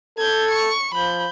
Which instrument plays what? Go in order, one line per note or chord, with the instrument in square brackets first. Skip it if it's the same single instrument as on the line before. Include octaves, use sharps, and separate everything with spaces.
[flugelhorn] A4 [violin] G6 G#6
[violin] C#6
[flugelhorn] F3 [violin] B5 G6